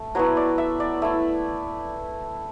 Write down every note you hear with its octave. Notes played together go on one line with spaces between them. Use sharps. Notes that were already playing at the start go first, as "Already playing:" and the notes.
Already playing: A3
F#3 B3 E4 C#5
D5
E5
D5
A3 E4 E5